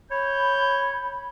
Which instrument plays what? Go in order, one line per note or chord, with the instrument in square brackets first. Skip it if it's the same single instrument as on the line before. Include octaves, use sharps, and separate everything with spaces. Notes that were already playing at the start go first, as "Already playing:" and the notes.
[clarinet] C#5 [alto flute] B5 [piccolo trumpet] G6